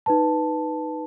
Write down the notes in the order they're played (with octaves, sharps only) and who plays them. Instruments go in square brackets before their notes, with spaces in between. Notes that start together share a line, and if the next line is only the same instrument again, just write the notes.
[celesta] D#4 B4 A5